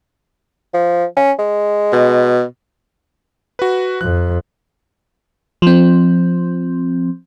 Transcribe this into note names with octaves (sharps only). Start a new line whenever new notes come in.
F3
C#4
G#3
B2
F#4 B4
F2 F#6
F3 C4